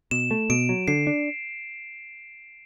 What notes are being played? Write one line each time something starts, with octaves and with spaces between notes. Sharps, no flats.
B2 E7
A3
B2 D7
F#3
D3 C7
D4